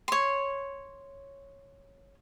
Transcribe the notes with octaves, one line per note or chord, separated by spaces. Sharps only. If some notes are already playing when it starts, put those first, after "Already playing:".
C#5 C6